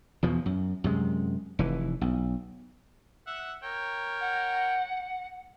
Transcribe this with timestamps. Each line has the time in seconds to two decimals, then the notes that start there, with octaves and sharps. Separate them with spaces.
0.23 E2 B2 F3
0.46 F#2
0.84 F#2 C3 G#3
1.59 F1 E3
2.01 B1
3.27 E5 F#5
3.63 A#4 C#5 G5
4.20 F#5